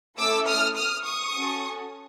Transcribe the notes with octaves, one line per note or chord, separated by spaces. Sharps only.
A3 C#4 E4 A4 D6 E6
D#6 F6
D#6 F6
C#6 D#6
C#4 F#4 A4